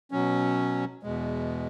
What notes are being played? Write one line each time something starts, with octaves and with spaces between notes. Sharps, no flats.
B2 F#3 C#4
E2 B2 G#3